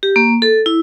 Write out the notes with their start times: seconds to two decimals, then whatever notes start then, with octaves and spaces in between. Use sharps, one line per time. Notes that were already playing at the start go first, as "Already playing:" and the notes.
0.03 G4
0.16 A#3
0.42 A4
0.66 E4